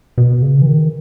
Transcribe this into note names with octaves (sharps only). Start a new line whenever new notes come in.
B2
C#3
E3
D#3